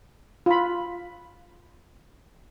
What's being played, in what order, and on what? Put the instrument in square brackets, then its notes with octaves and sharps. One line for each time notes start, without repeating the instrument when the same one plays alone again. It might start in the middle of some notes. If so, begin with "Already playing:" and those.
[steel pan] F4 B5